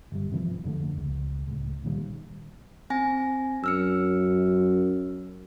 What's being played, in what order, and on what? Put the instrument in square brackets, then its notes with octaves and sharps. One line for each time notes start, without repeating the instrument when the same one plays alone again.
[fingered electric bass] G1 G3
G#1 C3 E3 F3
F2 D3 A3
C#2
C#2 A2
A#2 D#3 G3
[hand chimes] C4 G#5 A#6
[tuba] F#2 [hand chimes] E6 F6 C#7